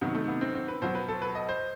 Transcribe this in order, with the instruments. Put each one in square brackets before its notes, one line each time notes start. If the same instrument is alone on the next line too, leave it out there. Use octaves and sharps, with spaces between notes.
[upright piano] C3 D#3 F#3 B3
A3
B3
C4
C4
B4
B2 F#3 C5
B4
A4
B4
D#5
C5